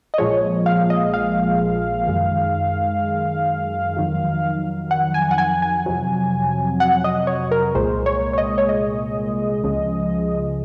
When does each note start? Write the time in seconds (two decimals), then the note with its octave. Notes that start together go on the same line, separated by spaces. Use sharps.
0.14 D#5
0.18 A#1 A#2 F3 G#3 C#5
0.66 F5
0.90 D#5
1.14 F5
2.07 F#2 D#3 G#3
3.96 F2 D#3 F#3
4.91 F#5
5.14 G#5
5.31 F#5
5.38 G#5
5.62 G#5
5.86 F2 C3 F#3
6.80 F#5
7.04 D#5
7.27 C#5
7.51 A#4
7.75 C2 A#2 G#3 C5
8.06 C#5
8.33 C#5
8.38 D#5
8.58 C#5
8.69 D#5
9.63 C#2 C#3 F3 G#3